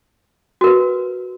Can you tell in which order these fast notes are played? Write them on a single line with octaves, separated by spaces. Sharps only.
F#4 A#4 B4